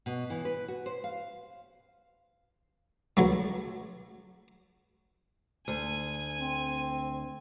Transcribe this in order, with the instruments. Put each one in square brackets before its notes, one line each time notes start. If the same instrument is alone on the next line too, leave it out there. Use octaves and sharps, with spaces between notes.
[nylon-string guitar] B2
E3
B4
F#4
C5
F5
[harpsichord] C#2 F#3 A3
[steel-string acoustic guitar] D2 [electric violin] G#5
[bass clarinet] C4